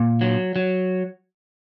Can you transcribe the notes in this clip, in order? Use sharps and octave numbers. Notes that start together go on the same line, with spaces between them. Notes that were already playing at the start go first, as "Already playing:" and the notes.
Already playing: A#2
F#3
F#3